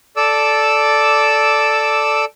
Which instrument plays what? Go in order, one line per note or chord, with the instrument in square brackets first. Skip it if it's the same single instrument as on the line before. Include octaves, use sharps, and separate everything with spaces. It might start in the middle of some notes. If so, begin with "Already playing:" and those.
[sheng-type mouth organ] A4 D5 D6 E6